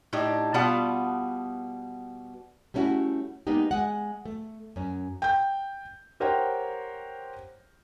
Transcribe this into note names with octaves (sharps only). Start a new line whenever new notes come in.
A2 D4 D#4 G4
B2 G3 B3 F4 F#5 A5
G3 A3 C#4 E4 F#4
G3 G#3 A#3 B3 D#4 G4
G#3 F#5
A3
F#2 C#4
G5 G6
G4 A#4 C5 C#5 F#5 G5